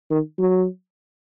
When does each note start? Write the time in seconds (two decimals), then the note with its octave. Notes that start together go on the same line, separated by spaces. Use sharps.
0.10 D#3
0.39 F#3